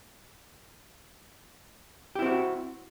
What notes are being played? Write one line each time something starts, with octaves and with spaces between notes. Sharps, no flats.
C4 E4 F#4 G4